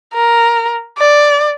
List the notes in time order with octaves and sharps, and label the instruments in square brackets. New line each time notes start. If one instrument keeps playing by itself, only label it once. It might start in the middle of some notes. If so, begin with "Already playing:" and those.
[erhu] A#4
D5